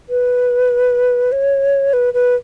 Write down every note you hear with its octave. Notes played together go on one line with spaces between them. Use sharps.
B4
C#5
B4
B4